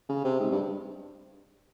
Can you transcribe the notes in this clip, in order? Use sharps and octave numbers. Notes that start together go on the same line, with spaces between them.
C#3
C3
G#2
G2